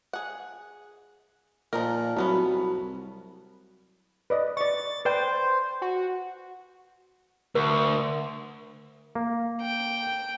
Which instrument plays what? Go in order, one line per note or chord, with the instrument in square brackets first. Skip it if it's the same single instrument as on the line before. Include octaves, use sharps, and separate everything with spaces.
[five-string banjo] G#4 F#5
[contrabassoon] A#2 [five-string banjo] F3 D#4 A#4
[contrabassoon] C2 [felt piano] F#3 B5 [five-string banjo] A3 B3 C#4
[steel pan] B4 D5 D#5
[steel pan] D5 C#6 [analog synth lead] A6
[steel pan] B4 D5 G5 [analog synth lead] C5
[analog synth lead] F#4
[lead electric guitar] D2 [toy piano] A#4
[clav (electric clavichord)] A#3
[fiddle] G5